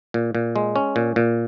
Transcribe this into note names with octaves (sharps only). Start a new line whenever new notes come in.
A#2
A#2
G#3
C#4
A#2
A#2